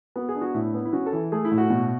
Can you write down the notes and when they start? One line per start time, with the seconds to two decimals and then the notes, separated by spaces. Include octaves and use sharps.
0.16 B3 F#4
0.29 G#4
0.35 D4
0.41 F#4
0.54 A2 E4
0.74 B3
0.85 E4
0.93 C#4 F#4
1.06 A4
1.13 E3
1.32 A3 G#4
1.45 E4
1.51 A2
1.58 F#4
1.70 B2